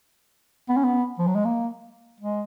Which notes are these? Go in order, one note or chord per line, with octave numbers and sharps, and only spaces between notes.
B3
C#4
B3
F3
F#3
G#3
A#3
G#3